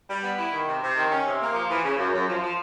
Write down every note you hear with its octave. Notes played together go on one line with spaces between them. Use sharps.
G3
B3
E4
D#3
C3
C3
D#3
C#4
C3
A#3
F3
E3
C#3
F#2
F#2
F3
F3